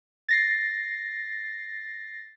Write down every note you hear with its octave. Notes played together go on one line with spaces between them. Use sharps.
A6 A#6 C7